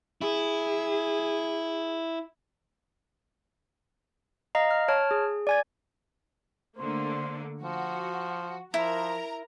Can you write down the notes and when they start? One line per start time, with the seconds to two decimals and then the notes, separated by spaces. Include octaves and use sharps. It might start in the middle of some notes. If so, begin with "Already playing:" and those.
0.21 E4 G#4
4.55 D#5 F5 A#5
4.71 F6
4.88 C#5 A5 F6
5.11 G#4
5.47 D5 G#5 G#6
6.78 D3 A3 A#3 C5
7.63 F3 F#4
8.74 F3 E4 A#4 A#5